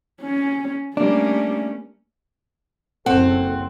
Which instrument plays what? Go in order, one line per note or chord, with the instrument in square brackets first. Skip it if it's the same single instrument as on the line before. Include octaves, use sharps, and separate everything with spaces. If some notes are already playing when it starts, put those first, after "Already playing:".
[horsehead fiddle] C#4
[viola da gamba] G3 A#3 [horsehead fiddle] A3 C#4 [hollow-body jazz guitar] D4
[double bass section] F#1 [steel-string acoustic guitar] C4 [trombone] A4 [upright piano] F#5